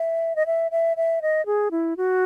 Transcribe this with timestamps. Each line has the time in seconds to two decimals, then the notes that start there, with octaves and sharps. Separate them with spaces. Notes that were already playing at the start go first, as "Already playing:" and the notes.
Already playing: E5
0.36 D#5
0.46 E5
0.71 E5
0.97 E5
1.22 D#5
1.46 G#4
1.71 E4
1.97 F#4